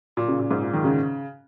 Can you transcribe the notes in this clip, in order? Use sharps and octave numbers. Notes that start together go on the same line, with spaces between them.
A#2
C#3
A#2
G#2
A#2
D#3
C#3